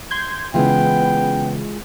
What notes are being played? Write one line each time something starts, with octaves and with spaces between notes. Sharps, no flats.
C6 G6 G#6
C#3 E3 G#3 B3 E4 F4 G5